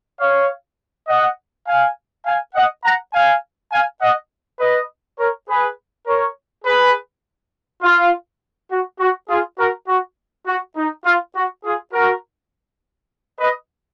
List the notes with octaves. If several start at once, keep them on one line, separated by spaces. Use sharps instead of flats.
C#5 F5
D#5 F#5
F5 G#5
F5 G#5
D#5 F#5
F#5 A#5
F5 G#5
F5 G#5
D#5 F#5
B4 D#5
A#4 C#5
G#4 B4
A#4 C#5
G#4 B4
F4
F#4
F#4
F4 G#4
F#4 A#4
F#4
F#4
D#4
F4
F#4
F4 G#4
F#4 A#4
B4 D#5